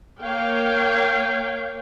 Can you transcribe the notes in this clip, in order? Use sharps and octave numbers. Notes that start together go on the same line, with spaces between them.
A#3 C#5 F5 G5